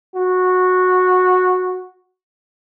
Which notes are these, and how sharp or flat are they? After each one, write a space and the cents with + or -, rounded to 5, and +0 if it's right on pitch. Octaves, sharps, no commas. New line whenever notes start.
F#4 -10